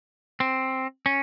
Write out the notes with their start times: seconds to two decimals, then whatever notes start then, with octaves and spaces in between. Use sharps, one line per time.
0.40 C4
1.06 C#4